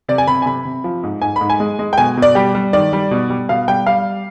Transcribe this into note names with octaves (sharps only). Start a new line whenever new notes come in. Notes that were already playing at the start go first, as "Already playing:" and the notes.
C3 D5
G#5
C3 B5
G#5
C3 B5
C3
F3
G#2
G#2 G#5
G#2 B5
G#5
G#3
G#3
G5
B2 G#5
B2
D5
G3 G4
G3
D#3 D5
G3
B2
G3
B2 F5
G3 G5
G3 F5